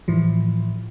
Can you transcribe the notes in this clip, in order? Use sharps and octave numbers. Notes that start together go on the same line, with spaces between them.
A2 E3 F3